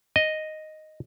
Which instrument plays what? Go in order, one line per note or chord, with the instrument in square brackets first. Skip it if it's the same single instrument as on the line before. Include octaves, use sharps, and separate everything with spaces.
[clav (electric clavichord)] D#5